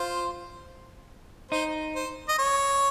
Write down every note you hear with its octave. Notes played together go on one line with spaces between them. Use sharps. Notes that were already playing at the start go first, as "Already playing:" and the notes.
Already playing: F4 C5
D#4 C5
C5
D#5
C#5